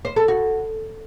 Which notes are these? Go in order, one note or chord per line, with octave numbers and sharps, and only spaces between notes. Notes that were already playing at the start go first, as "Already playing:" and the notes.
C5
A4
F#4